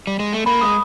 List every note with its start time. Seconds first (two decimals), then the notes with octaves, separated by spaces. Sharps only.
0.07 G3
0.20 G#3
0.33 A3
0.46 A#3 B5
0.61 G#3 D#6